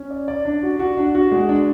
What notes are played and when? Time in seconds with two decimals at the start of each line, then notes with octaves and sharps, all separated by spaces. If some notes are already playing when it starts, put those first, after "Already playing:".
Already playing: C#4
0.10 D5
0.28 D5
0.45 D4
0.63 F#4
0.79 F#4
0.97 D4
1.15 F#4
1.32 G#3
1.49 D4